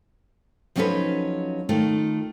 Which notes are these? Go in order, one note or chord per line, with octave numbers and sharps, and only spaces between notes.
F3 F#3 C#4 D#4 A4 B4
D#3 A3 F4 A4